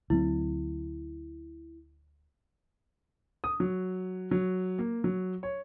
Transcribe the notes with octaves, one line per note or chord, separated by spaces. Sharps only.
D2 F#3 C4 E4
D#6
F#3
F#3
A#3
F#3
C#5